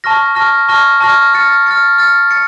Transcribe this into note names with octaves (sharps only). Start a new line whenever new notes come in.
A5 C#6 F6 A#6
A5 C#6 F6 A#6
A5 C#6 F6 A#6
A5 C#6 F6 A#6
F6 A6 C#7
F6 A6 C#7
F6 A6 C#7
A6 C#7